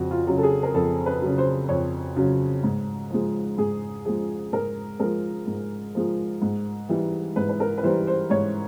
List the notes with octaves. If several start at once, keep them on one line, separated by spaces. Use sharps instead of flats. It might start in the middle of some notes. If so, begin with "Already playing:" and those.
Already playing: F2 C#3 F#4
F4
C#3 F#3
A4
G#4
A#4
F2 A4
B4
C#3 F#3
C5
F2 C#5
C#3 F#3
G#2
F3 G#3
G#2 G#4
F3 G#3 G#4
G#2 A#4
F3 G#3 A#4
G#2
F3 G#3
G#2
E3 G3
G#2 B4
B4
A#4
B4
E3 G3 C5
C5
G#2 C#5